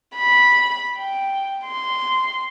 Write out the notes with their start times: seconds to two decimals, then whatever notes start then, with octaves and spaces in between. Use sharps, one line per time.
0.17 B5
0.96 G5
1.66 C6